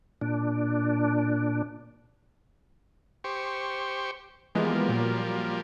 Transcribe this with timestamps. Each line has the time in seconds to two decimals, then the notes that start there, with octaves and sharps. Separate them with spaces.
0.21 A#2 D4
3.24 G4 C5 C#6
4.55 E3 F3 G3 G#3 A#3 B3
4.88 A#2 F#3